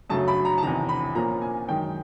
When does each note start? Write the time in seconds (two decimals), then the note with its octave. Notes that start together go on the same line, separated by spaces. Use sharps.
0.10 F#2 C#3 F#3 A3 A5
0.28 B5
0.45 A#5
0.58 A5
0.62 E2 C3 D#3 A#5
0.89 B5
1.15 A#2 F3 A#3 C#4 A#5
1.42 G#5
1.68 F#2 D#3 G#3 G5